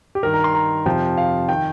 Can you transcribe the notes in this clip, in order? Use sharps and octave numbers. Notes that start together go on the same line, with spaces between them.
G4
G2 D#3 A#4
A#5
C6
A#5
F2 C3 F3 G5
F5
D#3 G5